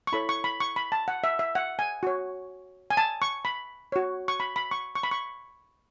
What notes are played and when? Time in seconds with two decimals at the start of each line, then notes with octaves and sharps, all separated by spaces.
0.07 C#6
0.12 E4 A4 C#5 B5
0.29 C#6
0.44 B5
0.60 C#6
0.76 B5
0.92 A5
1.08 F#5
1.24 E5
1.39 E5
1.55 F#5
1.79 G#5
2.03 F#4 C#5
2.90 G#5
2.97 A5
3.22 C#6
3.45 B5
3.92 F#4 C#5
4.28 C#6
4.40 B5
4.56 B5
4.71 C#6
4.95 C#6
5.03 B5
5.11 C#6